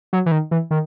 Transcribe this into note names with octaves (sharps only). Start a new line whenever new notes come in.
F#3
E3
D#3
E3
D#3